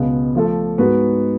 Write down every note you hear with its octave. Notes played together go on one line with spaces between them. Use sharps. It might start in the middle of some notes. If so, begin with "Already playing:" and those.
Already playing: C#2 B2 G#3 B3
F3 A3 F4 A4
G#2 G#3 B3 F#4 B4